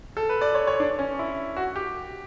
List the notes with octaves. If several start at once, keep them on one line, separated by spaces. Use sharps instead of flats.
A4
B4
D5
C#5
C#5
D4
C#4
E4
F#4
G4